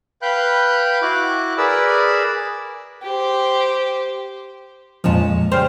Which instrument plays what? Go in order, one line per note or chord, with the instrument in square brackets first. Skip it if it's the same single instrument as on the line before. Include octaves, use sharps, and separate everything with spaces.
[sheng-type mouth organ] B4 F5 G5 B5 F#6 G6
E4 F#4 D6 F#6
G#4 A#4 B4 D5 B5 E6
[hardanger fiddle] G4 C5
[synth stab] F2 A#2 F3 [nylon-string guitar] G#3 C#4 A5
[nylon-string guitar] C#3 G3 C5 [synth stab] G5 C6 F6